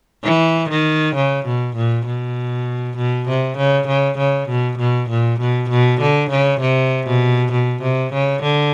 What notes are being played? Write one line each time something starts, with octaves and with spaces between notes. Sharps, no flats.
E3
D#3
C#3
B2
A#2
B2
B2
C3
C#3
C#3
C#3
B2
B2
A#2
B2
B2
D3
C#3
C3
B2
B2
C3
C#3
D3